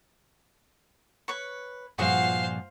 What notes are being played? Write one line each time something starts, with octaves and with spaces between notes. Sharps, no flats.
B4 C#5 C#6
G2 A#2 F3 F#4 G#4 C5 F5 F#5